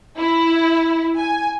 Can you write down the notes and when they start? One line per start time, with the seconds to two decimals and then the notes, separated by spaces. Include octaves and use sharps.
0.18 E4
1.17 G#5